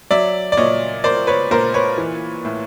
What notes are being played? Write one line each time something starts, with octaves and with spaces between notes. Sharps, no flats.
F#3 D5 E5
D5
A#2 C#5 D#5
A#3 C5 D5
B4 C#5
A#2 A#4 C5
B4 C#5
E3
A2